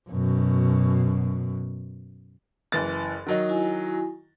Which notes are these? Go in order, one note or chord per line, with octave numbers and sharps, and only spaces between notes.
F#2 B2
F#1 E3 A6
D#3 F#3 D#4
E4 F#4 G#5